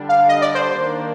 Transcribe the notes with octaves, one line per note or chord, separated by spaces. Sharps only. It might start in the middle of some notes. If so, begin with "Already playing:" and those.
Already playing: D3 G3 D4
F5
D#5
D5
C5
D#3 A#3 D4